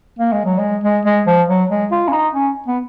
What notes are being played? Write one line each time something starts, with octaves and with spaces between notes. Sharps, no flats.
A#3
G#3
F#3
G#3
G#3
G#3
F3
F#3
G#3
F4
C#4
D#4
C#4
B3